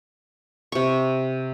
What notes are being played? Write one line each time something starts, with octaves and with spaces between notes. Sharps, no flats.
C3 C#6